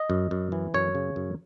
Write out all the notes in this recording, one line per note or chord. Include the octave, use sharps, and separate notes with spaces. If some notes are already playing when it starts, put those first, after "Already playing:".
Already playing: D#5
F#2
F#2
E3
F#2 C#5
C#3
F#2